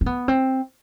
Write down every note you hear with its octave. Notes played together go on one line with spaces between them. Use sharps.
C4
B3
C4